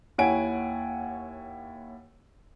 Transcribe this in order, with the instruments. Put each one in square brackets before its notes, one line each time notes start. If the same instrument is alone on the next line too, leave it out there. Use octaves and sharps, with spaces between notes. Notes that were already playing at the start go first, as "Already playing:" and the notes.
[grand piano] D#2 E4 C#5 F#5 G#5 D7